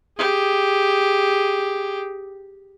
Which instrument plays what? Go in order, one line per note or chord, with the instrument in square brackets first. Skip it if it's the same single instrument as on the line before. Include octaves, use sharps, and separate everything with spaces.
[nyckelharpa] G4 G#4